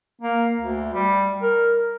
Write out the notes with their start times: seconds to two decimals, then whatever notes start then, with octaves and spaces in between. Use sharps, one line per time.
0.21 A#3
0.60 D2
0.93 G3
1.42 A#4